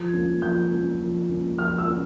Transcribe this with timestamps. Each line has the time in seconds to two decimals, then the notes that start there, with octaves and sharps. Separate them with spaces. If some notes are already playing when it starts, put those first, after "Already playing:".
Already playing: F3 G#6
0.13 A#3 C#4
0.42 F3 G6
0.71 A#3 C#4
1.00 F3
1.29 A#3 C#4
1.58 F3 F6
1.78 E6
1.88 A#3 C#4